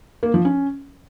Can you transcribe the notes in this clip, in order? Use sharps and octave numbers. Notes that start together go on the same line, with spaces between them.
A#3
F3
C#4